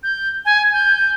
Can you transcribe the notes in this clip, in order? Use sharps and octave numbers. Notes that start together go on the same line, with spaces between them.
G6
G#5
G6